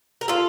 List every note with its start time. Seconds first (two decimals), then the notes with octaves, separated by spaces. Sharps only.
0.21 A#4
0.28 F4 A4